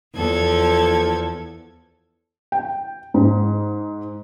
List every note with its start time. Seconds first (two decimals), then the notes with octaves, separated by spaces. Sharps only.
0.16 E2 F3 A4 G#6
2.52 G5
3.14 G#2